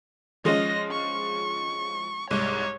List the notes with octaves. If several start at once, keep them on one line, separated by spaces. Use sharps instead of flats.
F3 G#3 C#4 D#5 A#6
C#6
C2 G#2 C#5